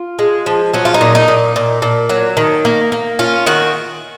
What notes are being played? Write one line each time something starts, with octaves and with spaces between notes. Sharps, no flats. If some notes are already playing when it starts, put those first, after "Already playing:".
Already playing: F4
G#3
F3
F#3 C#4
F4
D#4
A#2
D#4
A#2
A#2
A#2
F#3
D#3
A#3
A#3
C#4 F4
D#3 F#4